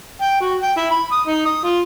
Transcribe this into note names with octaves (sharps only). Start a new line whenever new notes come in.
G5
F#4
G5
E4
B5
D#6
D#4
D#6
F4